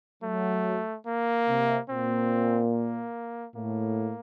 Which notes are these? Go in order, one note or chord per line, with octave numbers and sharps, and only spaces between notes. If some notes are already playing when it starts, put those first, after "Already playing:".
F#3 A3
A#3
C3
A#2 C4
A#3
A2 A#3